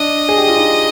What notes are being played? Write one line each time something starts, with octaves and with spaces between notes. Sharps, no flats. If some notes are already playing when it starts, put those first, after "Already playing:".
Already playing: D4 D#5
G#4
G4
F4
D#4